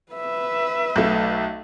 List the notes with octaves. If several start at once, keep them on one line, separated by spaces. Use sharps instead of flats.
B4 E5
B1 A3